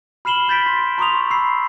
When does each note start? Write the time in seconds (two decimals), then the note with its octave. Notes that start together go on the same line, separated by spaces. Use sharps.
0.25 B5 F6 C7 E7 F#7 G7
0.48 B5 G6 A6 B6 D7
0.66 C6
0.98 A#5 C6 C#6 D#6 F7
1.30 B5 E6 C7